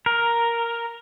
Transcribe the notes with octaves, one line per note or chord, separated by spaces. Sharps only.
A#4